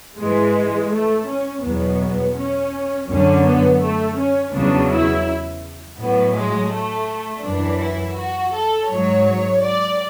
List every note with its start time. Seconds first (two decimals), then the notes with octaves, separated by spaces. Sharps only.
0.18 G#2 E3 G#3
0.91 A3
1.27 C#4
1.63 E2 B2 F#3 B3
2.35 C#4
3.09 F#2 D3 F#3 C#4
3.44 B3
3.81 A3
4.17 C#4
4.53 E2 C#3 F#3 D4
4.90 E4
5.98 A2 F#3 B3
6.34 G#3
6.70 A3
7.43 F#2 E3 D4
7.79 E4
8.16 F#4
8.52 A4
8.88 G#2 F#3 C#5
9.60 D5